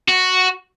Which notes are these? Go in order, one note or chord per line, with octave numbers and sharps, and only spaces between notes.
F#4